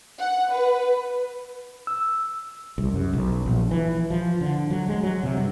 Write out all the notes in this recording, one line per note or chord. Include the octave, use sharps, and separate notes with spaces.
F#5
B4
E6
C2
F#2
B1
A#1
E3
F3
D3
F#3
G#3
F#3
C3
G2